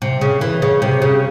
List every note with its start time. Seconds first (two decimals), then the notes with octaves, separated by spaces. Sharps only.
0.02 C3
0.21 C#3
0.41 E3
0.62 C#3
0.82 C3
1.02 C#3